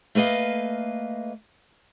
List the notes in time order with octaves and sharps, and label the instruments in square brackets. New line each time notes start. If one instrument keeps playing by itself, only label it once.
[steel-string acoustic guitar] A3 A#3 B4 D#5 F5